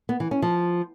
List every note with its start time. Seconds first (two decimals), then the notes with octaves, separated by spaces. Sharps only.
0.09 B3
0.20 E3
0.31 C#4
0.42 F3